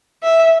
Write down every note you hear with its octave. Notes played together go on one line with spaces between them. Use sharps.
E5